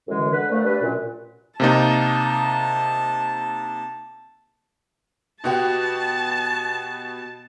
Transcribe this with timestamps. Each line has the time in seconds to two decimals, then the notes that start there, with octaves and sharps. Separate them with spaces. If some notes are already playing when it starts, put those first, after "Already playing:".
0.08 F#2 A2 D3 E3 G#3
0.31 D3 B4
0.50 A#2 F3 A3
0.64 G3 D4 B4
0.82 F#2 A#2
1.60 C3 A#3 D#4 A5
5.44 B2 F#4 G4 A5